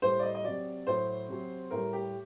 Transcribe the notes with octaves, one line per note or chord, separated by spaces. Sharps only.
A2 G3 C5
D5
D#5
D#5
C3 F#3 D5
A2 F#3 C5
C3 F#3
A2 G3 A#4
G4